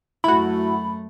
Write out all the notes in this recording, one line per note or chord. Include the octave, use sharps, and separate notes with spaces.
F#2 A3 E4 F#4 B5